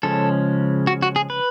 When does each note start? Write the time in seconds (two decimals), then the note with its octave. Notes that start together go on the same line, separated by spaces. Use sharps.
0.03 C#3 F3 G#3 C#4 A4
0.87 F#4
1.02 F#4
1.16 G#4
1.30 B4